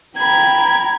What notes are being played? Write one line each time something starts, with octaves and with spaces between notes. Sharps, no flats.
G5 A#5 B5 G#6